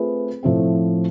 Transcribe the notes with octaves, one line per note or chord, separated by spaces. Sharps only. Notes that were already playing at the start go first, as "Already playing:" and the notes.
Already playing: A3 C4 F4 G#4 B4
A2 F3 A3 C4